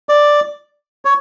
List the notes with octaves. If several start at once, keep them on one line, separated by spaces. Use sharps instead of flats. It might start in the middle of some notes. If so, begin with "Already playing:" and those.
D5
C#5